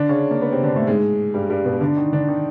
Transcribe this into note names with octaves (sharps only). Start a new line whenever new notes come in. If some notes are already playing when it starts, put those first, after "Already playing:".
Already playing: D3 D4
C#3 C#4
A#3
B3
C3 C4
D3 D4
A2 A3
G#2 G#3
G2 G3
G2 G3
B2 B3
D3 D4
D#3 D#4
D3 D4
D#3 D#4